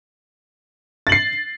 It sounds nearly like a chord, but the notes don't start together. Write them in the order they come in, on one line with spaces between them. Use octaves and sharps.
A6 F#7 C7